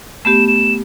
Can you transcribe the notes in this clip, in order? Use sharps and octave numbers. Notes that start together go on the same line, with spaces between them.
A3 B3 G4 E7
E7